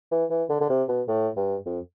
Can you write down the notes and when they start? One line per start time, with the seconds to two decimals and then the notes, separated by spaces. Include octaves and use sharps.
0.11 E3
0.30 E3
0.50 D3
0.61 D3
0.70 C3
0.89 B2
1.08 A2
1.36 G2
1.66 F2